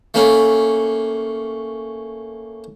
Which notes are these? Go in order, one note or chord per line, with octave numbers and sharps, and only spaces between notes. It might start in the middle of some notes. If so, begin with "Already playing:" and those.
A3 A#3 C#4